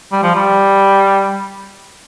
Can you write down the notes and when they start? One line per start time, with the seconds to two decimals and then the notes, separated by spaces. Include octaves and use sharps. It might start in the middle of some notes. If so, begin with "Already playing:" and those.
0.12 G3
0.23 F3
0.35 G3